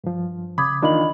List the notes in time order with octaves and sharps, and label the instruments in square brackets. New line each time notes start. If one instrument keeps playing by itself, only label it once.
[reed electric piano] G2 F3
[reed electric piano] C#3 [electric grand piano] B5 [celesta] D6 D#6 G#6
[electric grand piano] D#2 D#3 [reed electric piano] E3 D4 F4 [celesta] D#5 B5 F#7